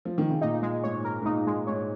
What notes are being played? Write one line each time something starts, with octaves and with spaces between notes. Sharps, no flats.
F3
D#3
C#3
A#2 D#4
G#3
G#2 C#5
A#4
G#2
A#2 D#4
G#3
G#2 C#5